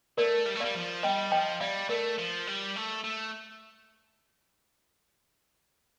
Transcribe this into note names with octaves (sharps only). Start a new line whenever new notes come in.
A3 A#4 D5
G3
A3
G3 D5 F5
F3
G3 D#5 G5
F3 D#5 G5
G3 D5 F5
A3 A#4 D5
F3
G3
A3
A3